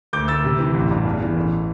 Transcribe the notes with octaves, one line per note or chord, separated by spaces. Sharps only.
D2 D6 G6
D2 E6 A6
C3
E3
A1
G2
E2
E3
A1